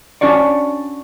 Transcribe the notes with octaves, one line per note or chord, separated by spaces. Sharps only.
C#4 D4 F#4 C#5 D5